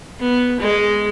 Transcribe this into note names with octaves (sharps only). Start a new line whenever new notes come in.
B3
G#3